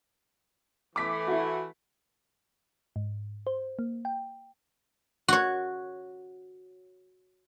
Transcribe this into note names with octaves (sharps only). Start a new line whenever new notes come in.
E3 A3 D6 B6
E4 F#4
G#2
C5
A#3
G5
F#4 C#5